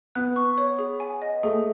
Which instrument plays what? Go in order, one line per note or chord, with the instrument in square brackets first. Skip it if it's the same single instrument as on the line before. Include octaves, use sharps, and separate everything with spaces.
[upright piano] B3 [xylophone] F#6
[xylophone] C#6
C#5
G#4
G#5
D#5
[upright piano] A3 [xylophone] G#4